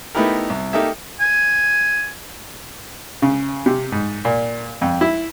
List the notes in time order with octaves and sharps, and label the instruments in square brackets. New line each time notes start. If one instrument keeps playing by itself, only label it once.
[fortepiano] A3 B3 D#4 E4 G4 A#4
C2
A#3 D#4 G4 A4 E5
[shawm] G#5
[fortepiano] C#3
C3
G#2
A#2
F2
E4